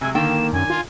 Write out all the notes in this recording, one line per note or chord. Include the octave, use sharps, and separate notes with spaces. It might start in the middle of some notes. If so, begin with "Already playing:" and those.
C3 F#3 G#3 G#5
D3 D#3 A#3 G5 E7
F#2 G#5
F4